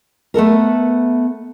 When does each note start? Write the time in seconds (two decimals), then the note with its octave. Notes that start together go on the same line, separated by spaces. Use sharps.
0.34 A3 B3 A4 A#4